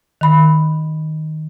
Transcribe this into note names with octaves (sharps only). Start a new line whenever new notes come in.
D#3 B5